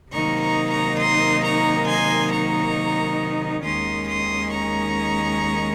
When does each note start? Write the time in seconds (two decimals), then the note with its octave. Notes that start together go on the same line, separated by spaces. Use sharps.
0.12 C3 D#3 F#3 A#3 D#4 A#5 C#6
0.41 A#5 C#6
0.70 A#5 C#6
0.99 C6 D#6
1.43 A#5 C#6
1.87 G#5 C6
2.31 A#5 C#6
3.63 D#2 D#3 G#3 C#4 C6 D#6
4.07 C6 D#6
4.51 A#5 C#6